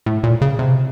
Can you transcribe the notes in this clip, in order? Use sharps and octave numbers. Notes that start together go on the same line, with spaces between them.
A2
A#2
C#3
C3